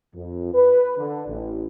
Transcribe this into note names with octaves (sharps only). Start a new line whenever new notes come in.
F2
B4
D3
A1